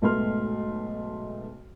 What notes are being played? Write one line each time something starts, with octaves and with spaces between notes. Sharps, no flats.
B1 G#2 A3 B3 C6 F6